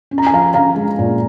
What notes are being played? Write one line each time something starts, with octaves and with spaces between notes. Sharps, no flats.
C#4
A#5
G#5
F3 F5 A#5
C#4 F5 A#5
G#3
A#2